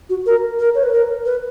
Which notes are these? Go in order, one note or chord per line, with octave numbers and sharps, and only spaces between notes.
F#4
A#4
A#4
C#5
B4
A#4
B4